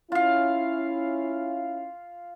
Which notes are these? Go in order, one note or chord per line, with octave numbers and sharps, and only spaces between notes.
C#4 E4 F4 F5